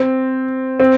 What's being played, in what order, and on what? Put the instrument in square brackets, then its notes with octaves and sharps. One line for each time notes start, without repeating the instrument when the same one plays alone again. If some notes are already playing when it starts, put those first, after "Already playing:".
Already playing: [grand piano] C4
C4